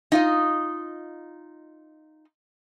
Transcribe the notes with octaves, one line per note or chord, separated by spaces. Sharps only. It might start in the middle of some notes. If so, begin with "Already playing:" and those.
D#4 F4 D#5